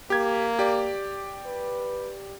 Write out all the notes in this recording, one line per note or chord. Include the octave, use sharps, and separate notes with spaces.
A#3 G4 G#6
G4 D5
B4